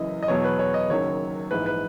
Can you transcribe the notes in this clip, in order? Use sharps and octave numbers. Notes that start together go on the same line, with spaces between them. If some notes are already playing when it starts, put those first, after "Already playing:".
Already playing: F#1 F#2 E3 D#5
D#5
E2 B2 F#3 C#5
B4
C#5
D#5
F#1 F#2 D#3 F#3 C#5
A#1 G#2 E3 B4
B4